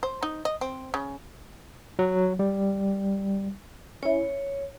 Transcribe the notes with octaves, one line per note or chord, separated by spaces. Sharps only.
C5
D#4
D#5
C4
C#3
F#3
G3
C#4 E4 C#5